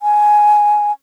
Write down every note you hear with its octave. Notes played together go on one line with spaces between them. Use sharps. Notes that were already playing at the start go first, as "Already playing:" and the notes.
G#5